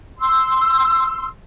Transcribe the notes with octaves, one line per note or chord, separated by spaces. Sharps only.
C6 E6